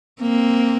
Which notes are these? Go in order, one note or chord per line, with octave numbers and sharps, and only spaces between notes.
A#3 C4